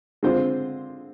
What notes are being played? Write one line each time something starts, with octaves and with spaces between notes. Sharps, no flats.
D3 G#3 C4 F4 C5